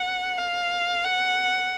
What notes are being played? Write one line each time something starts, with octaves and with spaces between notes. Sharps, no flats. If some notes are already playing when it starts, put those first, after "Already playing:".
Already playing: F#5
F5
F#5